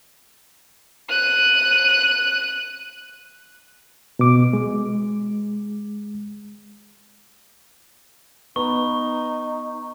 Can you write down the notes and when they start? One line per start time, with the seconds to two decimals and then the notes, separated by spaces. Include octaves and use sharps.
1.09 F#6 D#7
4.19 B2 D6
4.53 G#3
8.56 B3 D#4 C#6